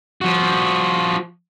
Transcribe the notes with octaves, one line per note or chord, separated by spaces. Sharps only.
F3 F#4